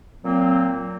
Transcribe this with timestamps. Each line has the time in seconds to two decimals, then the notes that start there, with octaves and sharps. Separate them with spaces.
0.24 A#2 F#3 A#3 C4